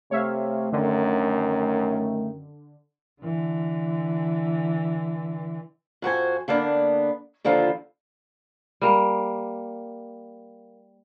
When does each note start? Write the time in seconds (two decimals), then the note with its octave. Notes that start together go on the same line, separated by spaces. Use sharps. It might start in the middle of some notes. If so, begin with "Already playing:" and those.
0.11 C3 A3 C#5 E5 F5
0.73 F#2 D3 D#3
3.22 D3 E3
6.02 F2 F#4 C5 G#5
6.48 D3 A#3 B3 D4
7.45 D#2 D3 F3 E4 F4
8.81 G3 A#3